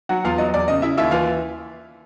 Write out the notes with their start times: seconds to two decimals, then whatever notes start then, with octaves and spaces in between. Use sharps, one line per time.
0.09 F#3 F#4 F#5
0.24 E2 F4 F5
0.38 F#3 D#5
0.49 D#5
0.54 E2 D5
0.68 C#3 D#5
0.82 C#3 E4 E5
0.97 D#2 E4 E5
1.11 E3 F4 F5